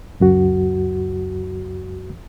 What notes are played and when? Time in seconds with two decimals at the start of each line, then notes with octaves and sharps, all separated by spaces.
0.20 C#2 F#2 F#4